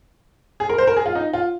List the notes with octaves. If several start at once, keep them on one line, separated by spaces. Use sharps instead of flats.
G#4
A#4
C5
A#4
G#4
F4
D#4
F4